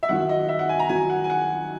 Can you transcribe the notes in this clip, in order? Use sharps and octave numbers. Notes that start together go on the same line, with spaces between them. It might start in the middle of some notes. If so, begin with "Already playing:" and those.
E5
F#2 D#3 F#3 F#5
D#5
E5
F#5
G#5
A#5
F#2 D#3 F#3 G#5
F#5
G#5
F#5